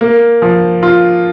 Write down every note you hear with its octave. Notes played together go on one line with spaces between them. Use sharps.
A#3
F3
F4